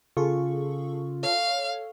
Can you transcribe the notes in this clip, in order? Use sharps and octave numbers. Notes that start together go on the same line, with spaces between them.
C#3 F4 G#4 A4 C#6
A4 C#5 F5